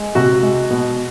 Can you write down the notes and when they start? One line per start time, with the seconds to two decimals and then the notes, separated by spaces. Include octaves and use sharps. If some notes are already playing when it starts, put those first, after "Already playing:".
Already playing: G#3
0.15 C3 F#4
0.43 G#3
0.70 B2